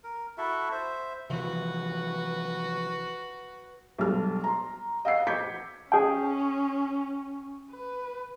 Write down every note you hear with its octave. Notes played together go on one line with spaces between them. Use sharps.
A#4
E4 F#4 A4 E5
C5 E5
C3 E3 F3 F#4 B4
B1 G2 G#3 A4 F6
A#5 C6
D#5 F5 F#5 E6 C7
D6 G6 G#6 B6 C#7
C#4 G#4 G5
B4